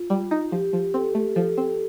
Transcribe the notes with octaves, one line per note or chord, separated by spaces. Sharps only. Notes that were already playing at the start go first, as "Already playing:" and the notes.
Already playing: F4
G3
D#4
F3 G4
F3
C4 A4
A3
F3 A4
C4